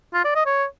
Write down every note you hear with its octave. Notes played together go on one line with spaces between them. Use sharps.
F4
D5
D#5
C#5